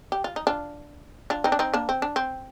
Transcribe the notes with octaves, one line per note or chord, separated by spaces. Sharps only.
G4
F4
D#4
D4 F4
D4 F4
C4 D#4
D4
C4 D#4
A#3 D4
C4
D4
C4